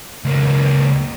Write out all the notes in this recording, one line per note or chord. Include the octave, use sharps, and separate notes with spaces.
C#2 A#3